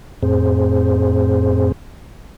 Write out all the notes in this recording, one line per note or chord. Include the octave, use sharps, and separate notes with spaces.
F2 A2 C4 G#4 C5